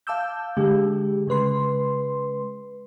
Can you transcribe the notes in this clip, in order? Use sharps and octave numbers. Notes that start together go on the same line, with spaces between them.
F5 A5 D6 E6 G6
D3 G#3 G4
C#3 G#3 B4 C6